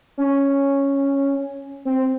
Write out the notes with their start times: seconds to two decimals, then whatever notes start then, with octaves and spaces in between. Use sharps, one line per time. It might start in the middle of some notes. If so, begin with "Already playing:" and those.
0.18 C#4
1.85 C4